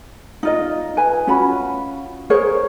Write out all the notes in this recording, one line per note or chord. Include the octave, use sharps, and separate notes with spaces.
D#4 F4 D#5
B4 G#5
C#4 F4 F#4 B5
G#4 A#4 C5 C#5